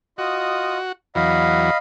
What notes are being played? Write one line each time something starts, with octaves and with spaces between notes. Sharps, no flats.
F4 F#4 D#5 D#6
E2 F#3 D#5 F5 B5